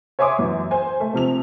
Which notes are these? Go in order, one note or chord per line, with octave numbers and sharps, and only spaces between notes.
C#5 E5 G#5 C6 D6 D#6
F#2 E3
C5 G#5
A3
C3 F3 F7